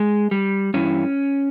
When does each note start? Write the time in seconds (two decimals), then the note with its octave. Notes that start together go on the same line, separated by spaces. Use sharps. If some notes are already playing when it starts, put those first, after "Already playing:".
Already playing: G#3
0.31 G3
0.74 G2 E3 C#4